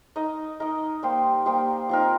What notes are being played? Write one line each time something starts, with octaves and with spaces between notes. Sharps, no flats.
D#4 A#4 D#5
D#4 A#4 D#5
G3 A#3 G4 C5
G3 A#3 G4 C5
F3 C4 D#4 A#4